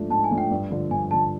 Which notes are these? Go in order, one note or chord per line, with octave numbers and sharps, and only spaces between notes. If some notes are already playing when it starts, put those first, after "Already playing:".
Already playing: G#2 F3 A3 D4
G#2 A5
G#5
F3 A3 D4
G5
G2
D3 F3
G2 G#5
D3 F3 A5